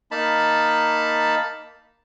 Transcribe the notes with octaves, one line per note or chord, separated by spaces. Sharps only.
A#3 D#4 A5 B5